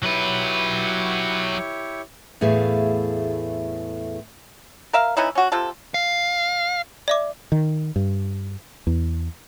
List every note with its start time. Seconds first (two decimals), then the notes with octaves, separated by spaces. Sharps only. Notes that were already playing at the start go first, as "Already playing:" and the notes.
0.03 F#3 E4 G4 B4 C#5
2.41 E2 A2 A3 G#4 F5
4.93 A#4 E5 F5
5.17 E3 C#4 D#4 E4
5.35 C#4 F#4
5.52 C3 F4 A4
5.94 F5
7.08 D5 E5 D6
7.52 D#3
7.96 G2
8.87 E2